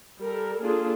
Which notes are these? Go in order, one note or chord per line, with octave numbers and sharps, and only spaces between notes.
G3 A4 A#4
A#3 D4 F4 G#4 A4